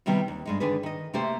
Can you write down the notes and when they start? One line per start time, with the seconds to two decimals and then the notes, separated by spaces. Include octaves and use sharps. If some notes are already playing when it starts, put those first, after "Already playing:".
0.06 C3 D#3 G3 B3 C4
0.28 D#2
0.46 G2 G#3 D#4
0.60 D3 D#3 D4 G#4 B4
0.83 D#3 D#5
1.13 C3 A3 A#3 G4 C5